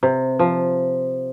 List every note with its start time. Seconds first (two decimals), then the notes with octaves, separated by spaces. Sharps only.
0.03 C3
0.39 F3